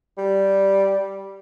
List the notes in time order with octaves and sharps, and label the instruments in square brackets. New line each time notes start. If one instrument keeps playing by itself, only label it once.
[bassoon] G3